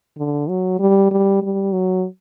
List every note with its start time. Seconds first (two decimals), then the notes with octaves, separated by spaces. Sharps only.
0.18 D3
0.49 F#3
0.79 G3
1.11 G3
1.42 G3
1.73 F#3